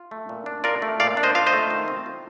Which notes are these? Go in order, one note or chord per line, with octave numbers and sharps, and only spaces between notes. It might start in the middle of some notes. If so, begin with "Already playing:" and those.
Already playing: F4
A3
A#2
D4
F4 A#4 D5
A3
A#2 D5 F5
D4
C5 D#5
F4 F5
C5 D#5
A3
D#3
C4
F4